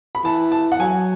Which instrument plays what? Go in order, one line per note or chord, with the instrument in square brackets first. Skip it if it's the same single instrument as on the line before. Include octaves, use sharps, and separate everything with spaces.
[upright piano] B5
[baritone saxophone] E3 [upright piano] A5
[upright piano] A5
F#5
[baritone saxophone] F#3 [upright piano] G#5